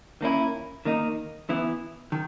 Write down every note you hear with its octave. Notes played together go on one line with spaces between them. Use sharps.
D#3 A#3 C#4 E4
D#3 A#3 D#4
E3 B3 E4
D#3